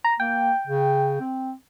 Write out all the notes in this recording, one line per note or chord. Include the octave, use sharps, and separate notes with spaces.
A#5
A#3 G5
C#3
C4